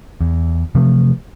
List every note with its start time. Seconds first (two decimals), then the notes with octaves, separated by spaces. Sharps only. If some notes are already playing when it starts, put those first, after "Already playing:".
0.21 E2
0.75 C3 E3 F3 A3